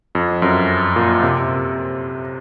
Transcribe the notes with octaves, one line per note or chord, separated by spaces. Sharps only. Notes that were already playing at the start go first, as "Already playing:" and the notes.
F2
F#2
A#2
C3